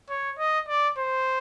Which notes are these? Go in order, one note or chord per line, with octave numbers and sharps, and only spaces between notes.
C#5
D#5
D5
C5